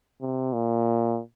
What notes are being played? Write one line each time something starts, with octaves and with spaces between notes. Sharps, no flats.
C3
A#2